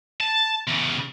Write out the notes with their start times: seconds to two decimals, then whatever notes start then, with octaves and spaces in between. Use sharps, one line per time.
0.21 A5
0.68 E2 C#3